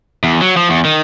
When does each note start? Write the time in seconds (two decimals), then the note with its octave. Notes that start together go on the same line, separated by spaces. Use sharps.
0.24 E2
0.41 F#3
0.57 F3
0.70 E2
0.85 D#3